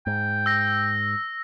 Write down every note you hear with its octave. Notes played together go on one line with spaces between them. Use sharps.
G#2 G5
E6 A#6